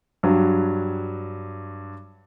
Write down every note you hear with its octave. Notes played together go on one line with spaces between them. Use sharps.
G2 F#3